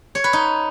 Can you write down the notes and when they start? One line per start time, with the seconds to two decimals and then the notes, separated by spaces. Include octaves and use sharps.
0.15 C#5
0.24 B4
0.33 D#4